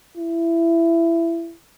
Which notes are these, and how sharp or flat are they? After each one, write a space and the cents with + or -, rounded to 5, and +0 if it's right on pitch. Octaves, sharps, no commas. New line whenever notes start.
E4 +20